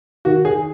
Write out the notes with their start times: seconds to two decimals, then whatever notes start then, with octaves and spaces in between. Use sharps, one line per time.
0.25 D#3 F#4
0.45 G#4